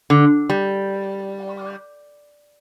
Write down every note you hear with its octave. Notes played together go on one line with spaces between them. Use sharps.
D3
G3